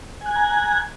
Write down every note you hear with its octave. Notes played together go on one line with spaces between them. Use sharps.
G#5 A#5 F#6 G#6